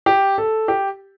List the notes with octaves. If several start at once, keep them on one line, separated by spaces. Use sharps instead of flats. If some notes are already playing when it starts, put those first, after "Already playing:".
G4
A4
G4